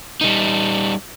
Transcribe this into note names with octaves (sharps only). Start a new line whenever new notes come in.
G3 D#4